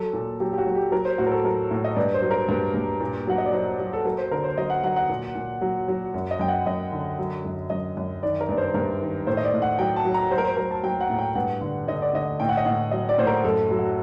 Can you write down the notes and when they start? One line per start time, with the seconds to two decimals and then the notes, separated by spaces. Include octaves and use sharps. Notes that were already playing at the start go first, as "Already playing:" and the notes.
Already playing: F#3 A4
0.13 A#2
0.40 F#3 G4
0.53 G4
0.58 F#4
0.66 F#3
0.75 G4
0.92 F#3 A#4
1.05 C5
1.18 A2 F#4
1.26 A#4
1.31 A4
1.44 F#3 A#4
1.71 A2
1.84 D#5
1.96 G2 D5
2.14 C5
2.22 F#3
2.31 A#4
2.49 G2
2.74 G2
3.00 A#2
3.27 F#3 F#5
3.38 D#5
3.46 D5
3.53 F#3 C5
3.80 F#3
3.93 A4
4.05 F#3 A#4
4.18 C5
4.31 D3 A#4
4.44 C5
4.58 F#3 D#5
4.70 F#5
4.83 F#3 F#5
4.96 F#5
5.09 A#2
5.35 A#2
5.61 F#3
5.88 F#3
6.14 F#2
6.31 D#5
6.39 F#2 G5
6.48 F#5
6.66 F#2 D#5
6.92 D3
7.19 F#3
7.45 F#2
7.70 F#2 D#5
7.97 F#2
8.22 D#3 D5
8.41 A#4
8.49 G2 D5
8.57 C5
8.74 G2 A#4
9.01 D#3
9.27 A2 C5
9.37 D#5
9.45 D5
9.54 A2
9.62 F#5
9.79 F#3 G5
9.96 A5
10.05 F#3
10.14 A#5
10.31 F#3 C5
10.38 A#4
10.44 C5
10.57 F#3 A#4
10.71 A5
10.83 F#3 G5
11.01 F#5
11.10 A2
11.19 G5
11.35 G2 F#5
11.61 D3
11.87 D3 D#5
12.02 D5
12.13 D3 D#5
12.40 A2 G5
12.49 F#5
12.57 D#5
12.65 A2 F#5
12.91 F#3 D#5
13.09 D5
13.18 A2 C5
13.27 A#4
13.44 F#2 A4
13.70 F#3
13.79 F#4